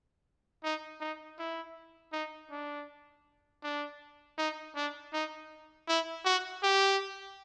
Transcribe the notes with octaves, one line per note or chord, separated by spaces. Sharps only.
D#4
D#4
E4
D#4
D4
D4
D#4
D4
D#4
E4
F#4
G4